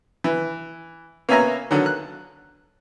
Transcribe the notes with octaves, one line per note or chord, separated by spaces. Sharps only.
E3
A#3 B3 C#4 E5 G#5 A#5
D3 D#3 F#3
F#6